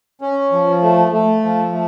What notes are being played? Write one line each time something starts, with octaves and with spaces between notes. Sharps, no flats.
C#4
F3
A3
A3
F3
A3